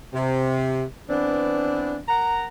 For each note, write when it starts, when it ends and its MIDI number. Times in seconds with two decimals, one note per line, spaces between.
0.14 0.83 48
1.09 1.98 52
1.09 1.98 59
1.09 1.98 60
1.09 1.98 62
2.08 2.46 70
2.08 2.46 78
2.08 2.46 82